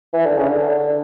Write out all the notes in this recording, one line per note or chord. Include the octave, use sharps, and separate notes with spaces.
E3
D3
C#3
D3
D3